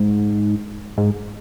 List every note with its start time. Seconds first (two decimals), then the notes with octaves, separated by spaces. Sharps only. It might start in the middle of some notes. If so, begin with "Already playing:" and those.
Already playing: G#2
0.98 G#2